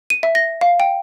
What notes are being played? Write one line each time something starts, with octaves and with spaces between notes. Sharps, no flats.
D#7
E5
A#6
F5
G5